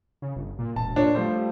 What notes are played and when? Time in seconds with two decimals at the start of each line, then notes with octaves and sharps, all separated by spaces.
0.22 C#3
0.36 G1
0.59 A#2
0.76 E1 A5
0.96 A#2 D4 C#5
1.15 F3 G3 A3 C5